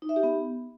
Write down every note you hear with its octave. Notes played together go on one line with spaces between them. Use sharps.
D#4
E5
G4
B3